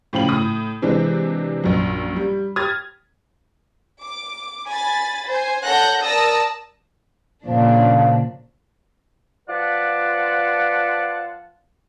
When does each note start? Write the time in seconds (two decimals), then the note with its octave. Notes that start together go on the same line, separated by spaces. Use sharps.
0.13 A2 C#3 F3 G5 F#7
0.29 A2 D#6
0.82 C3 E3 G#3 C4 D4
1.64 A#1 F#2
2.16 G3
2.56 G4 D#6 F6 G#6 A6
4.01 D6
4.69 G#5 B5 A6
5.27 C5 G#5
5.64 A4 C#5 F#5 F#6 G6 A#6
6.02 A#4 D5 A5 D#6 E6 A#6
7.46 A#2 C#3 F3 D4
9.48 F3 F4 B4 D5 F#5 A5